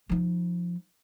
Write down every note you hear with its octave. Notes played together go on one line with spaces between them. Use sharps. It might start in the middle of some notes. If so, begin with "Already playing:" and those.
F3 D#4